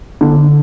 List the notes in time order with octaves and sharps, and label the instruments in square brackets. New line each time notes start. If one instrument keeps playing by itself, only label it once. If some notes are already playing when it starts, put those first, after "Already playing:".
[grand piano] D3